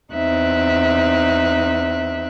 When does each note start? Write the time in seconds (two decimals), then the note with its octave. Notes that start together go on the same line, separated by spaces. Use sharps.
0.11 E2 C4 D#4 E5 F#6